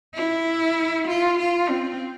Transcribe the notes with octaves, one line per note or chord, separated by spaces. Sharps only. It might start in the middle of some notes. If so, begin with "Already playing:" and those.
E4
F4
F4
C4